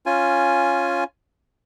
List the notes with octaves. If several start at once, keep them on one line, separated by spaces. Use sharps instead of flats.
C#4 F4 G#5